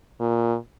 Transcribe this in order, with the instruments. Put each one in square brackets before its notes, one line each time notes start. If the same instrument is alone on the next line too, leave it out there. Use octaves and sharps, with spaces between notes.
[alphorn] A#2